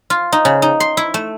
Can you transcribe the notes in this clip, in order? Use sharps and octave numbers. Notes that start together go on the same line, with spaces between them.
F4
D#4
C#3
D#4
C6
E4
A3